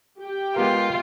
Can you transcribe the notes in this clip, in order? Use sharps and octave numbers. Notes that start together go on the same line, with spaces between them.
G4 G5
G#3 B3 F4 A#4